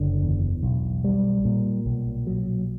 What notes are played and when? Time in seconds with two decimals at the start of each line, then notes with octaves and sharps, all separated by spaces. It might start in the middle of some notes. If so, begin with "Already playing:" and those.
Already playing: F#1 D3
0.22 E2
0.63 B1
1.04 G3
1.45 A#2
1.85 B1
2.27 F#3